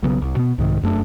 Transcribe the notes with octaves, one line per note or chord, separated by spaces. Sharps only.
B1 C#3 F#3 B3
C2
B2 B3
C2 G#2 C3 D#3
F1 F#2 A3 D4